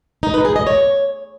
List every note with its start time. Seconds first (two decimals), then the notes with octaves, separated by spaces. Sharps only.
0.23 D#4
0.34 B4
0.45 G#4
0.56 D#5
0.67 C#5